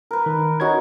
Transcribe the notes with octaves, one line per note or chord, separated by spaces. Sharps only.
A#4 B4
D#3
C#4 D#4 F#4 C#5 F#5 G#6